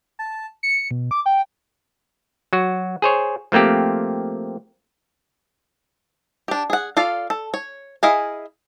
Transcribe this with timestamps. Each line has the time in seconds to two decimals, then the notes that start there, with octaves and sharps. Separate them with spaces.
0.19 A5
0.63 C#7
0.91 B2
1.11 D6
1.26 G5
2.53 F#3 F#4
3.02 G#4 C5 C#5
3.52 F3 A3 A#3 C4 G4
6.48 D4 G4
6.70 G#4 F#5
6.97 F4 A4 D5 F5
7.30 A4
7.54 C#5
8.03 E4 G#4 D#5 F5 G#5